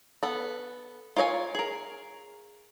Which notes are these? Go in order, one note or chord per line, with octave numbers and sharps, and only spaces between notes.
B3 A4
F4 A#4 C#5 D#5 G#5
G#4 A#4